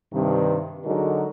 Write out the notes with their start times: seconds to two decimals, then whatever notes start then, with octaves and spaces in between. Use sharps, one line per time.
0.14 G2 C3 D#3
0.85 D3 F#3 G#3 D#4 F#4 A#4